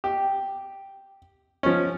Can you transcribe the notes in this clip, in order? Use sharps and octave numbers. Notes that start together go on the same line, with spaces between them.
G4
F3 C#4